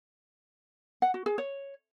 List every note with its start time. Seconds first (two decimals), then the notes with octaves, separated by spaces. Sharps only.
1.02 F#5
1.14 F#4
1.26 G#4
1.38 C#5